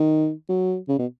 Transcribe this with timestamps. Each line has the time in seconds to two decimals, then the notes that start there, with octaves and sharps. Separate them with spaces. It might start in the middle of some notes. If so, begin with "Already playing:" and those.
Already playing: D#3
0.49 F#3
0.89 C#3
0.99 B2